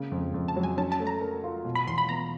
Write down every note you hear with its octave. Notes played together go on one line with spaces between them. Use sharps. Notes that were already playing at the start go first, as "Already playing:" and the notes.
Already playing: C#3 A#3
F2
F2
A5
F#3
G#5
C#4 A5
A5
A3
A#5
A#4
F4
B2
B5
E2 C6
B5
B3 A#5